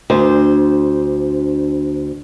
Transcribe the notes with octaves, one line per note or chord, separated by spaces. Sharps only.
D2 C5